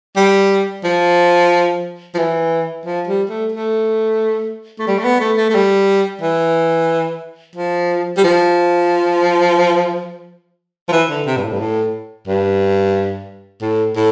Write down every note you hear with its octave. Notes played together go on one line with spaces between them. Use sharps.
G3
F3
F3
E3
F3
G3
A3
A3
A3
G3
A3
B3
A3
A3
A3
G3
E3
F3
G3
F3
F3
E3
D3
C3
G2
A2
G2
A2
G2
A2
A2